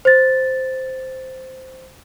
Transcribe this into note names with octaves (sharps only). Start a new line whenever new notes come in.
C5 A6